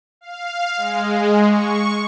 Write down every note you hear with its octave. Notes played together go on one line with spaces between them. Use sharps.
F5
G#3
C#6